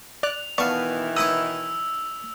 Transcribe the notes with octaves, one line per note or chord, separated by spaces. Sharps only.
D5 F#6 F7
B2 D#3 E3 B3 D5 F5 A5 C#6
D#4 E4 C#5 D#6 E6